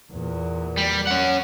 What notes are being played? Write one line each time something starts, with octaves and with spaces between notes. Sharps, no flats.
E2 A#2
G3
C#4 F#5